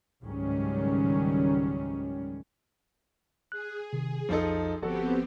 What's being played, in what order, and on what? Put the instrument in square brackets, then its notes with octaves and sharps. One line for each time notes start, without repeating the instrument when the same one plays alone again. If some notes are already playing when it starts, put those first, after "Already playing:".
[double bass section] C#2 G#2 D#3 F#3 G3 C#4
[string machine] G#4 [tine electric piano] F#6
[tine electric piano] C3 D#3
[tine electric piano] B1 F2 [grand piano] F3 D#4 A4
[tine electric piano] G1 F3 [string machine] B3 C4 G4 [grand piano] F#4 A4